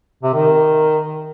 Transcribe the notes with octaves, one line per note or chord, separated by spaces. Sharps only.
C3
D#3